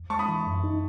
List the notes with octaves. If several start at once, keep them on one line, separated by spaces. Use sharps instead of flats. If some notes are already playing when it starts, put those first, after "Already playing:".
Already playing: E2
G#3 A5 C#6
B5 D#6
E3
F#2
D#4